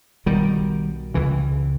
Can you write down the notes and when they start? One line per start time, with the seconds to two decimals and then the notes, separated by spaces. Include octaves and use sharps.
0.26 B1 B2 D#3 G3
1.14 C#2 C#3 E3